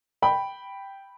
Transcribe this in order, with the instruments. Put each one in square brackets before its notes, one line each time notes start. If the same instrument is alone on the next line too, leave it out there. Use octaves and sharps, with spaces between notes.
[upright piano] G5 B5